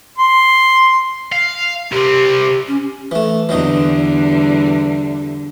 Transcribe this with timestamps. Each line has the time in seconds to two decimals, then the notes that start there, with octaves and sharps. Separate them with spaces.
0.18 C6
1.32 F5
1.92 C2 C4 G4
2.68 C#4
3.11 E3 A3
3.49 E2 D3 E3 F#3 G3 D#4